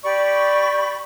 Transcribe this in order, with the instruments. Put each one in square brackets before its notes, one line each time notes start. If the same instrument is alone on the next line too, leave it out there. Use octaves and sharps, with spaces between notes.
[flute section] G4 D5 B5 C#6